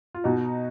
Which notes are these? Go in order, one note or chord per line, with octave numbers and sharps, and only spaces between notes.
F4
B2 D#4 F#4